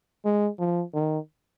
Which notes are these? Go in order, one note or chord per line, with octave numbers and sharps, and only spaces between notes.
G#3
F3
D#3